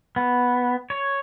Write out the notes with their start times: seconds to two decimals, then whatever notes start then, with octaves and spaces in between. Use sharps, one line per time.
0.16 B3
0.90 C#5